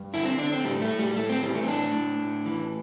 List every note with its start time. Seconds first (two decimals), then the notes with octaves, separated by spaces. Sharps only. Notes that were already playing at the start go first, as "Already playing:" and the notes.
Already playing: G2
0.13 D3 E4
0.25 C4
0.38 D3 D4
0.52 C4
0.64 A2 G3
0.82 A3
0.91 A2
0.99 G3
1.16 A2 A3
1.29 C4
1.42 E3 G3
1.55 A3
1.63 C4
1.68 A2 D4
1.94 A2
2.19 A2
2.46 E3